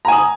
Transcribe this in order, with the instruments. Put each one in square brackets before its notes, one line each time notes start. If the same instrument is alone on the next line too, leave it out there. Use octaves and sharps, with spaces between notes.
[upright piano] A#5
G#5
D#6